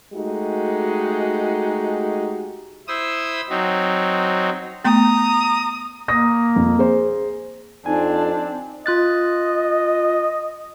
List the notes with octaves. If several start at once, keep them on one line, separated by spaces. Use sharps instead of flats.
G#3 A3 D#4 F#4 G4
E4 C5 D#6 E6
F#3 C4 D#4
A3 B3 A#5 D#6
A#3 D#6 A#6
F2
G#4 C5
F2 C4 D4 D#4 G#5
F4 D#5 F#6 A6